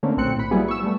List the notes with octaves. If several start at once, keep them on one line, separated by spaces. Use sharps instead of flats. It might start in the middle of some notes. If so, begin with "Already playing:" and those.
D3 A3 A#3 C4 C#4
B1 A#2 C4 F#6 C#7
A2 B5
F#3 G3 A#3 B3 E4 G#4
C#6 E6
G3 A3 B3